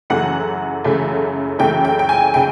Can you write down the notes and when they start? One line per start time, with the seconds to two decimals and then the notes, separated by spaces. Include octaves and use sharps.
0.10 F#2 C#3 E3 A3 F#5
0.84 F#2 C#3 E3 A3
1.59 F#2 C#3 E3 A3 G5
1.85 G5
1.99 G5
2.09 G#5
2.34 C#3 G5